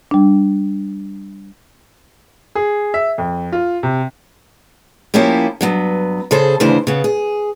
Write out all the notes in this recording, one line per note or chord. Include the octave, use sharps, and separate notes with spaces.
G3 D4
G#4
E5
F2
F4
C3
F3 A#3 C#4 E4 G4
G2 F#3 B3
C#3 G#4 A4 C5
D2 C#3 E3 D4 C5
C#3 B3
G#4